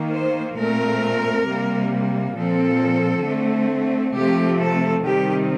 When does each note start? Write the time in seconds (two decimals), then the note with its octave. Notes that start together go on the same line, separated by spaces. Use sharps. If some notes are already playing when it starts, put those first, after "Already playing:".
Already playing: D#3 A#3
0.12 C5
0.57 A#2 A3 C4 A#4
1.46 C3 G3 A#3
2.35 A#2 F3 C4 A4
3.24 D3 A3 C4
4.14 C3 F3 A3 C4 G4
4.58 A4
5.02 C3 D#3 G3 C4 G4